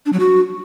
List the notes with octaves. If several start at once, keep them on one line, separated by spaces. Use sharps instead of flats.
D4
F#3
F#4